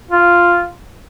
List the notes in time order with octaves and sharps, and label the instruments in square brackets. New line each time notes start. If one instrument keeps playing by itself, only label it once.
[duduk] F4